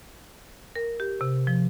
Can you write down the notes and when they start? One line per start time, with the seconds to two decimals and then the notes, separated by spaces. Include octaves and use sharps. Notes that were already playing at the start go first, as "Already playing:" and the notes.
0.76 A#4
1.00 G4
1.21 C3
1.47 F3